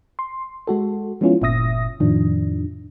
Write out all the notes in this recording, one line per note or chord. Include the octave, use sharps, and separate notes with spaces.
C6
G#3 F#4 A4
F3 G#3 B3 C#4 E4 F4
G1 A#2 E5 D#6 A#6
F2 A2 D#3 F3 D4